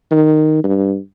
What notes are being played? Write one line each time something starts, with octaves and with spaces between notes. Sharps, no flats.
D#3
G2